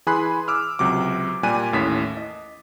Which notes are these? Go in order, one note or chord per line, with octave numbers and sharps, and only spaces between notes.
E3 G#4 G#5 B5 C6 F#6
D6 E6 F6
C#2 C3 F#3 D6
A#2 G3 G#5 F#6 D#7
A1 D#2 A2 C#4 A6 B6
D#5